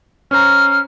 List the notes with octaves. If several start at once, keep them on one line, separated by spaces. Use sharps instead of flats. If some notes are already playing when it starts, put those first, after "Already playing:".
C#4 C5 A#5 F6